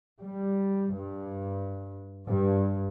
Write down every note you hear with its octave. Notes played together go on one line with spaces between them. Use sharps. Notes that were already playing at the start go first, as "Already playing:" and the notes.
G3
G2
G2